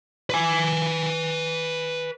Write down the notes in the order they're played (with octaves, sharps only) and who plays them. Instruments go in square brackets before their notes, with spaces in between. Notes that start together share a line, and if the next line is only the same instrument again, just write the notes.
[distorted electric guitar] B4 G#5